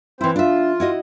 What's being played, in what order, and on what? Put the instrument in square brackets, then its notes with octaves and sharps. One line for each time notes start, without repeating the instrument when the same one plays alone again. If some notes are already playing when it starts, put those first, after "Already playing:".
[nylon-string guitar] E3 E4 [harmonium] C4 C5
[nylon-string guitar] D4 E5 [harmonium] F4
[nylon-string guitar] E4 F#4 D#5